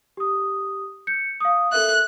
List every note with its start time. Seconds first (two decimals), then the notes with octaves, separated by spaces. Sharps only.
0.17 G4 D#6
1.07 G6 C#7
1.41 F5 D#6
1.72 A4 A#4 E5 F#6